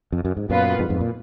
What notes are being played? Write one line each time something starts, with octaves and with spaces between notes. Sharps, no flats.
F2
F#2
G#2
F#2 A#2 B3 F4 B4
F2 G#2
F2 G#2
A#2